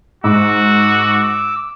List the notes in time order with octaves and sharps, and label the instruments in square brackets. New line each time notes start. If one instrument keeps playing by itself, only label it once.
[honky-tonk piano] G#2 [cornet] F#4 [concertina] D6 E6